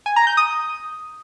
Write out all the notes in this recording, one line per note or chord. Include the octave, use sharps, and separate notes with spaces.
G#5
A#5
G6
D#6